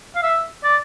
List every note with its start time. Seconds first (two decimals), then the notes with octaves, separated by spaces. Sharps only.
0.15 F5
0.23 E5
0.64 D5